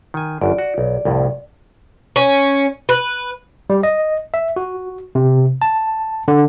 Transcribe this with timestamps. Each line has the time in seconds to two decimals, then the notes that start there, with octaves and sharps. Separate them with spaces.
0.14 D#3 G#5
0.41 G1 F#2 D5
0.59 F#4
0.78 B1
1.05 C2 F2 A2
2.16 C#4
2.89 B4
3.70 G3
3.83 D#5
4.34 E5
4.56 F#4
5.15 C3
5.62 A5
6.28 D3